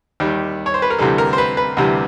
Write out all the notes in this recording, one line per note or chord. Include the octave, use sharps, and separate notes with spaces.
D#2 D#3 G3
C#5
C5
B4
A#4
D2 C3 E3 G3 A4
A#4
C5
B4
B4
D2 C3 E3 G3